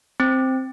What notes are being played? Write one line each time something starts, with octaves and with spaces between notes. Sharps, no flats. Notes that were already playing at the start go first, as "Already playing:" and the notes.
C4